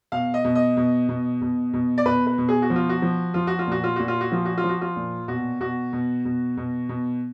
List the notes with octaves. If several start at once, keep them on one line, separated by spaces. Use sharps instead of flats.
B2 F5
D#5
B2
D#5
B2
B2
B2
B2
D5
B2 B4
B4
B2
G#4
F#4
F3
F4
F#4
F3
F3 F4
F#4
F4
A#2 F#4
F4
A#2 F#4
F4
F#4
F3 F4
F#4
F4
F3
F#4
F4
A#2
B2 F#4
B2 F#4
B2
B2
B2
B2